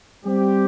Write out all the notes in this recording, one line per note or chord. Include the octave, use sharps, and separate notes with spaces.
G3 C4 G4